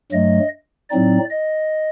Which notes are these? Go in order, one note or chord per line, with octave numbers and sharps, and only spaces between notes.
G2 F#3 A3 D#5
A2 F#3 C4 D#4 D5
D#5